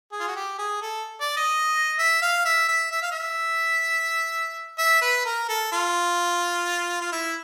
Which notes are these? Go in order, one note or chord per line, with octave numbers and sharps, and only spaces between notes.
G#4
F4
F#4
G4
G#4
A4
D5
D#5
E5
F5
E5
E5
E5
F5
E5
E5
B4
A#4
A4
F4
F4
E4